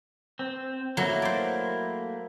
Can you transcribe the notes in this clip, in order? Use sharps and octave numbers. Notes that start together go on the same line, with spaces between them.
C4
F#3 A3 A#3 E4
C5 D5